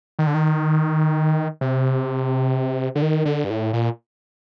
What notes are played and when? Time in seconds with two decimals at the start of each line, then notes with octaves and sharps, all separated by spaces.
0.19 D#3
0.27 D3
0.34 D#3
1.61 C3
2.95 D3
3.02 D#3
3.25 D3
3.44 G2
3.50 A2
3.73 A#2